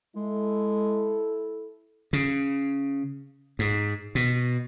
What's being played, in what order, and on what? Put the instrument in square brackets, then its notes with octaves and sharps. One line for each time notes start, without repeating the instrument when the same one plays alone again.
[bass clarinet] G#3 [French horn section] E4 A4
[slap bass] C#3
G#2
B2